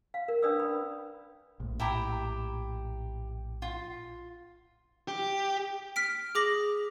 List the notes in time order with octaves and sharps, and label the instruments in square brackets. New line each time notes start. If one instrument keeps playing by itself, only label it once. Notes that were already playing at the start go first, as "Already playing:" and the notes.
[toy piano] F5
A#4
C#4 D4 B4 D5 D#6 E6
B5
[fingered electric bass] A#1 A2
[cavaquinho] E4 G4 A#5
F4
[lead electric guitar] G4
[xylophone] F6 B6 D7
G#4 D6 A#6 F#7